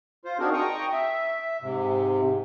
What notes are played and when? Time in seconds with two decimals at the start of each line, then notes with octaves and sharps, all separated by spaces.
0.25 F4 C5
0.39 C4 D4 D#4 F#4 G#4 A#4
0.54 G5 A#5 C#6 D#6
0.92 E5
1.62 G#2 C3